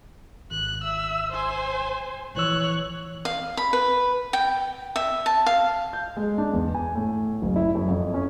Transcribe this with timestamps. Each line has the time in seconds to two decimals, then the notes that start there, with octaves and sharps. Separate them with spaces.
0.51 G#1 F#6
0.83 E5 E6
1.32 C5 G#5
2.35 A#1 E3 C#5 E6 F#6
3.25 F5
3.57 B5
3.73 B4
4.33 G5
4.96 E5
5.26 A5
5.46 F5
5.93 G6
6.17 G#3
6.38 D4
6.53 E2
6.75 G#5
6.95 A2
7.42 F#1
7.56 E4
7.75 F#2
7.88 F2
8.14 C#4